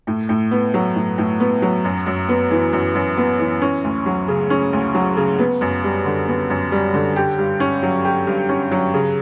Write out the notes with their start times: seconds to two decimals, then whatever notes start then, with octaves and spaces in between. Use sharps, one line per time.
0.07 A2
0.29 A2
0.51 B3
0.74 F#3
0.95 A2
1.18 A2
1.40 B3
1.62 F#3
1.84 F#2
2.06 F#2
2.29 B3
2.51 E3
2.73 F#2
2.95 F#2
3.17 B3
3.39 E3
3.62 C#4
3.84 D2
4.06 F#3
4.28 C#3
4.50 C#4
4.73 D2
4.94 F#3
5.17 C#3
5.39 B3
5.61 F#2
5.83 G3
6.05 D3
6.28 B3
6.50 F#2
6.72 G3
6.94 D3
7.16 G4
7.38 G2
7.60 C#4
7.83 F#3
8.05 G4
8.27 G2
8.49 C#4
8.71 F#3
8.94 C#3